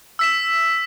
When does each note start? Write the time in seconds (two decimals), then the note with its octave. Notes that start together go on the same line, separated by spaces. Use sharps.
0.19 E6 B6 E7